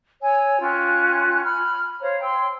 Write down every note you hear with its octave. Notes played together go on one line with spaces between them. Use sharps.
C#5 G#5 E6
C#4 F4 G5 F#6
B5 F6
C5 C#5 F5 A#5
G5 C6 E6